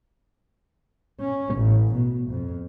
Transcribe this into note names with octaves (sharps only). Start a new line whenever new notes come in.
C#4
A1
B2
F2